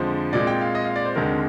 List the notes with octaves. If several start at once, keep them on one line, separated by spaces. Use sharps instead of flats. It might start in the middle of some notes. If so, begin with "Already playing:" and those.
Already playing: F2 D3 F3 G#3 C5
A#2 G#3 C4 D5
G5
F5
D#5
F5
D5
C5
D#2 D3 G#3 C4 A#4